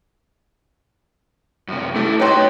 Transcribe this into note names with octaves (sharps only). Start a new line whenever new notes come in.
F#2 C3
A3 E4 G4 A4
D#4 B4 C#5 D#5 G5 C6